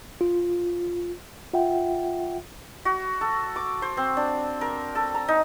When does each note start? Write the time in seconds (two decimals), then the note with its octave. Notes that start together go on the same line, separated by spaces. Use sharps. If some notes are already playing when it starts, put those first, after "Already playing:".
0.21 F4
1.54 F4 E5 F#5 G5
2.85 F#4
3.21 A4
3.56 D6
3.82 C5
3.97 C4
4.17 D4
4.61 A#4
4.95 A4
5.15 A#5
5.28 D#4